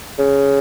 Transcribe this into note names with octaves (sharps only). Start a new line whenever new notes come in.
C#3